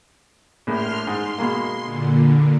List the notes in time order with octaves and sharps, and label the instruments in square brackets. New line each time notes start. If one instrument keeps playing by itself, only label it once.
[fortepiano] A#1 A2 [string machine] C6 F6
[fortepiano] G#2 [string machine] C6
[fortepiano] B2 G#3 A#3
[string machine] A#2 D3